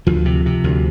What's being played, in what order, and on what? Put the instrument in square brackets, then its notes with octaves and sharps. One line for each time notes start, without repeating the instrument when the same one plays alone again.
[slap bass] D2 F3
C3
C3
D2